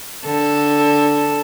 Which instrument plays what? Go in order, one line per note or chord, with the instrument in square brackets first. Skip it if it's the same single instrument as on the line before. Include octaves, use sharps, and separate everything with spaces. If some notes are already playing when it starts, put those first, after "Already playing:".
[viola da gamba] D3 [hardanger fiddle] A4